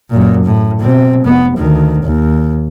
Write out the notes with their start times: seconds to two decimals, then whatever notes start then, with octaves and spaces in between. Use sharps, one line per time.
0.10 F#2 A#2
0.45 A2
0.80 B2 C4
1.24 F1 B3
1.57 D2 D#3
2.04 D#2